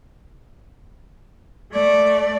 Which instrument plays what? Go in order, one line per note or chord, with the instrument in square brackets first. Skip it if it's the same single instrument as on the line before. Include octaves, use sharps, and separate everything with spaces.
[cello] A3 D5